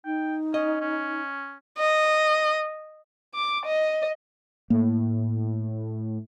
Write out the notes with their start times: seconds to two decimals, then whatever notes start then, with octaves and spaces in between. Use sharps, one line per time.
0.05 D#4 G5
0.54 C#4 D#5
0.81 C#4
1.78 D#5
3.34 D6
3.66 D#5
4.70 A2 A#3